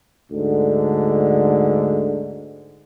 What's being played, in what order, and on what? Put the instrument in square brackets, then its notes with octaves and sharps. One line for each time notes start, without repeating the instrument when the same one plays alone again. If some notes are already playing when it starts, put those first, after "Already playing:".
[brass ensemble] D2 G#2 D3